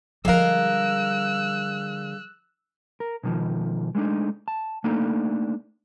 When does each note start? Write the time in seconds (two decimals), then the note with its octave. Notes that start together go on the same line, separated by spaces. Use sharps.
0.25 D3 F3 G3 G#3 A#4 F5 E6 F#6
3.00 A#4
3.24 B2 D3 D#3 F3
3.95 G#3 A3 C4 D4 D#4
4.48 A5
4.84 A3 A#3 D4 D#4 A4